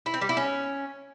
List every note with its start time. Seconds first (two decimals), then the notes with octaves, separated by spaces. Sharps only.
0.06 E4
0.14 C4
0.21 G3
0.29 E4
0.37 C#4